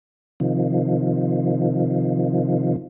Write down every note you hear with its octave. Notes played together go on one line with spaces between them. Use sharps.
C3 D#3 F3